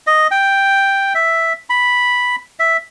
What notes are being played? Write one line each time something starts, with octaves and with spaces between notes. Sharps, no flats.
D#5
G5
E5
B5
E5